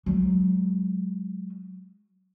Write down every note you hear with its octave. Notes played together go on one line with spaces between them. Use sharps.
F#3 G#3